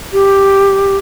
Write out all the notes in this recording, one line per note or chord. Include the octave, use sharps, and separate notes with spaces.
G4